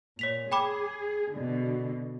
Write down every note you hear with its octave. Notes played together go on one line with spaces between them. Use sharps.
A#2 C#5 B6 F7
G#4 G5 B5 D6
B2 D3